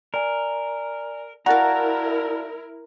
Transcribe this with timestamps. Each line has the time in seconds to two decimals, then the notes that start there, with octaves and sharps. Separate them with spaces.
0.14 A#4 D5 G#5
1.46 E4 F#4 A#4 D5 F5 A5 A#5 A6